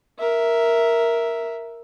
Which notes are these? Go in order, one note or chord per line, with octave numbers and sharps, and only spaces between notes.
A#4 E5